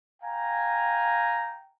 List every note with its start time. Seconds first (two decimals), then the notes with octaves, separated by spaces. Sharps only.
0.22 F5 G5 G#5 A#5